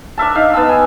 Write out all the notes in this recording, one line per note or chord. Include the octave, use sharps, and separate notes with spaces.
D4 A#4 E5 A5
D#4 F5
B3 A5 E6
G#5